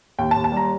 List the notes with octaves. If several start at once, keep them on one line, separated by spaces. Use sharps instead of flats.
D#2 G5
A5
D#2
A5
G3 A#5